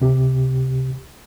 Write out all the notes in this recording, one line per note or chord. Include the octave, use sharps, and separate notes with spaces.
C#2 C3 G4